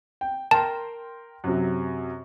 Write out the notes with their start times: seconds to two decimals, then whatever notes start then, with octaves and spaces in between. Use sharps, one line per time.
0.21 G5
0.51 A#4 G5 A5 C6
1.44 F#2 C3 F#3